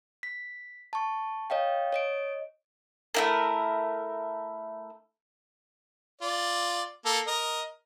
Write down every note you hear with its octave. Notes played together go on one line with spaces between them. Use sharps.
B6
A5 C#6
C#5 D#5 F5 G5
C#5 D#5 D7
A3 E4 A#4
F4 D5
A#3 A4
A#4 D#5